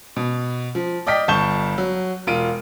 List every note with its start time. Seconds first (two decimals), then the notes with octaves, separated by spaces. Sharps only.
0.16 B2
0.75 F3
1.07 D5 D#5 G5 F6 B6
1.28 G1 A5 C#6 G6 E7 G7
1.78 F#3
2.27 E1 F4 D7 D#7